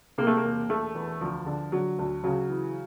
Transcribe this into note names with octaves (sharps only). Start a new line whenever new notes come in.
C3 A#3
A3
A#3
E1
E1 A3
E2
D2 F3
D3
D3 F#3
D2
C#3 F#3
E3